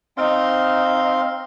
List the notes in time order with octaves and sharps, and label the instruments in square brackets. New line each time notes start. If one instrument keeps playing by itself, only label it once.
[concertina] C4 F5 C6 [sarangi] D#4